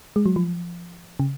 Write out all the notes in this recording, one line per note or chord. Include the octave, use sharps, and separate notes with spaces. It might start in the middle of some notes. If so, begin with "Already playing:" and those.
G#3
F#3
F3
C#3